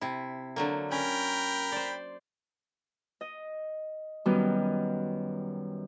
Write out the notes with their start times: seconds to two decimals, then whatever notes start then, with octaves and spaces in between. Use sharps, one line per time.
0.01 C3 E4
0.56 D3 F#3 A#3
0.91 C#4 A#4 G5 B5
1.72 C5 D5
3.21 D#5
4.25 F#2 D#3 G3 B3